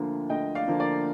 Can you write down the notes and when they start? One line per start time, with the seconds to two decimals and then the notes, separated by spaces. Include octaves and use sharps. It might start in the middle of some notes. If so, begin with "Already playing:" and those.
Already playing: D2 D3 F3 A#3
0.30 D2 D#5 G5
0.55 D5 F5
0.67 D3 F3 A#3
0.80 A#4 D5